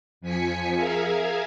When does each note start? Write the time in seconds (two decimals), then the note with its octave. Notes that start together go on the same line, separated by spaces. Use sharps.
0.21 F2 F3 G#5 B6 C#7
0.76 G#4 A#4 E5 F5 G#5